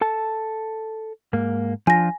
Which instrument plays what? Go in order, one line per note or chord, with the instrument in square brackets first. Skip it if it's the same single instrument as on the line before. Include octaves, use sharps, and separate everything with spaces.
[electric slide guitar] A4 A5
G#2 A#3
[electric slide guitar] F3 D4 F4 [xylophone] G#5 A#6